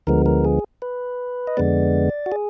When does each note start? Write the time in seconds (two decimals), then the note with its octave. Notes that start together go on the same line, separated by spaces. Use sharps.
0.07 D2 D3 F3 G#3 B3 A#4
0.26 A#4
0.45 G#4
0.82 B4
1.47 D#5
1.57 F2 D3 G#3 B3 D5
2.26 F#4
2.32 G#4